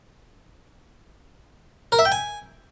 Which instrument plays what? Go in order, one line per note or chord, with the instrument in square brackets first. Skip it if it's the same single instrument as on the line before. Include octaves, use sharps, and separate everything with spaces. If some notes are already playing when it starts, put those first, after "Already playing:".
[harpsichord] A#4
E5
G5
G#5